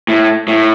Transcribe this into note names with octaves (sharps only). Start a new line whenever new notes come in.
A2
A2